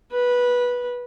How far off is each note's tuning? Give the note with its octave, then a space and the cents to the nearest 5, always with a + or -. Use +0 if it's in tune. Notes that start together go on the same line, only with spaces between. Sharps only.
B4 -15